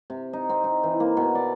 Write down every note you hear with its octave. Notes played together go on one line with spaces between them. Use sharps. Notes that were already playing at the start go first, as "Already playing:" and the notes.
C3
D#4
C4
D#4
E3
A#3
B2
D5